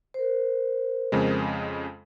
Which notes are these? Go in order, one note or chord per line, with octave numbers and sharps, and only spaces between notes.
A#4 C5
F2 C#3 G#3